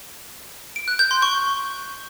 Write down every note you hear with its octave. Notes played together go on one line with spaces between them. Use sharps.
D7
F#6
G6
C6
C#6